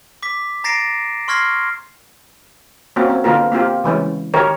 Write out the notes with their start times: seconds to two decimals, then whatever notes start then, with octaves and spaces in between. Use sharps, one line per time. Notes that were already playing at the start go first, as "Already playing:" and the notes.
0.23 D6 B6
0.64 A#5 A6 A#6 C7 D7 E7
1.28 C6 C#6 F6 G#6 A#6 C7
2.96 A#3 C4 C#4 F#4
3.10 C4
3.24 D3 A#3 B3 F4 A#4
3.52 A#3 C4 F4 G4
3.84 C#3 E3 G#3 C#4
4.34 D#3 G4 A#4 C#5